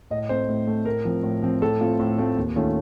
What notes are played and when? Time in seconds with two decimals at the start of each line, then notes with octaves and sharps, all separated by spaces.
0.11 A2 D#5
0.29 A3 C4 C5
0.49 A2
0.67 A3 C4
0.85 A2 A#4
1.05 F3 C4
1.23 A2
1.42 F3 C4
1.62 A2 A4
1.80 A3 C4 F4
1.99 A2
2.18 A3 C4 F4
2.37 D#2
2.56 D#3 A3 C#4 F4